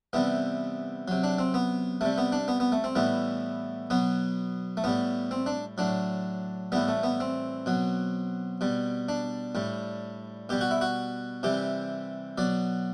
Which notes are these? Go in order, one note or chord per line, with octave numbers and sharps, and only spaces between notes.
C3 E3 G3 B3
C3 F#3
D4
C4
B3
C3 G3 A3
B3
D4
B3
B3
A3
C4
A2 E3 G3 B3
B2 F#3 B3
A3
A2 G3 B3
C4
D4
A2 F#3 D4
A2 E3 G3 B3
A3
B3
C4
B2 F#3
B2 G3
D4
A2 G3
B2 G3 G4
F#4
E4
F#4
C3 E3 G3 G4
B2 F#3 D5